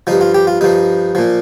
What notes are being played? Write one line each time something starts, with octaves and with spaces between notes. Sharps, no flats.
G2 F3 D#4
F4
G4
F4
G2 F3 D#4
A#2 F3